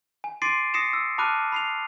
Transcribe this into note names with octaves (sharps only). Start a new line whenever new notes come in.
G#5
C6 D6 A6 C7 D7 D#7
D#6 A#6 C7 C#7 E7
E6
A5 B5 D6 F6 F#6 D#7
B5 C7 F7